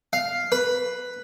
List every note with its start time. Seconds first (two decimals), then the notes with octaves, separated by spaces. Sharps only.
0.13 F5
0.52 B4